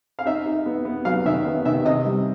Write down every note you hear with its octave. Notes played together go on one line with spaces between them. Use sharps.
F5
D#4 E5
D#4
B3
B3
F#3 F5
D#3 E5
B3
D#3 E5
C3 D#5
G3